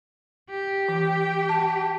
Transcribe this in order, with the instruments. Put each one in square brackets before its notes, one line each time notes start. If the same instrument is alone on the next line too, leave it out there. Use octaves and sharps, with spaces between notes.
[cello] G4
[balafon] E3
A5